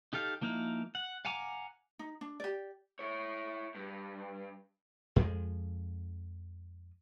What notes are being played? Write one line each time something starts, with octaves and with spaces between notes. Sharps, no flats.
D#4 G4 A4 F5
F3 A#3 D#4 E4 F5
F#5
F5 F#5 G#5 A#5 D6
D#4
D4
G4 D5
E4 C#5
G2
F2 F3 G#3